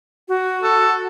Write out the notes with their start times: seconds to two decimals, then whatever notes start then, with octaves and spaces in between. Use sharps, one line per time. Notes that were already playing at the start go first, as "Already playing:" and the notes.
0.28 F#4
0.62 A4